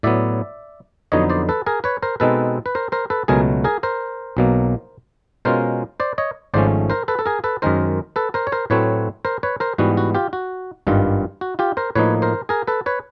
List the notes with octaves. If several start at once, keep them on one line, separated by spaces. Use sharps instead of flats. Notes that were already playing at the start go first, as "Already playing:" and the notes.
A2 F#3 B3 D5 E5
F2 D3 F#3 B3 D#4 C#5 D#5
C5 D5
A4 B4
G#4 A#4
B4 C#5
A#4 C5
B2 G#3 C4 D#4 A4 B4
B4
A#4 C5
A#4 C5
A4 B4
C#2 B2 F#3 A3 G#4 A#4
G#4 A#4
A#4 C5
B1 B2 F#3 A#3
B2 G#3 C#4 F4 A#4 C5
C5 D5
C#5 D#5
G#1 G#2 F3 A3 C#4 C5 D5
A#4 C5
A4 B4
A4
G#4 A#4
A4 B4
F#2 D#3 G#3 A#4 C5
A4 B4
A#4 C5
C#5
A#4 C5
A2 F#3 A3 C4 B4 C#5
A#4 C5
B4 C#5
A#4 C5
G#2 E3 G3 B3 F#4
F#4
F4 G4
F#4
G#1 G2 D#3 G3 F4
F#4
F4 G4
A#4 C5
A2 F3 A#3 D#4 B4 C#5
A#4 C5
G#4 A#4
A4 B4
B4 C#5